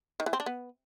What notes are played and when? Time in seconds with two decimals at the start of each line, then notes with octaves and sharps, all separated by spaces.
0.20 D#3
0.26 E3
0.33 C4
0.40 D4
0.46 B3